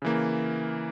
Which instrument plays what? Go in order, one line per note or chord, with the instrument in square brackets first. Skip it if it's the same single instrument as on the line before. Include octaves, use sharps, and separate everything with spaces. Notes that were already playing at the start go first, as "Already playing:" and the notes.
[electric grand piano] C#3 E3 A#3